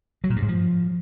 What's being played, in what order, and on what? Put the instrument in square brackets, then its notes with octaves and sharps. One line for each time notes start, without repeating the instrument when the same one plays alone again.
[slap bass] F#3
A#2
G2
G#2
F3